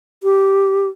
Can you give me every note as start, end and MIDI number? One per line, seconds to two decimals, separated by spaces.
0.23 0.87 67